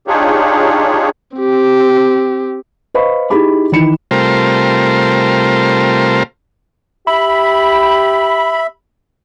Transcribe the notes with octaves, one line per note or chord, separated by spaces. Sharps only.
D4 D#4 F4 G4 G#4 C#5
C4 G4
B4 C5 D#5 F5 B5 C#6
D#4 E4 G4 G#4 B5 D6
D#3 E3 B5 C#7 E7
C3 G3 A3 F4 A#4 C5
G4 E5 B5